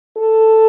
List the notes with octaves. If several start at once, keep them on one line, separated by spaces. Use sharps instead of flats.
A4